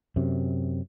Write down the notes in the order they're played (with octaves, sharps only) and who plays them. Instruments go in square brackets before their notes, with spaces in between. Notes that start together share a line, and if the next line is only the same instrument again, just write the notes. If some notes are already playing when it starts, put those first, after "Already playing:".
[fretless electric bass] F#2 C3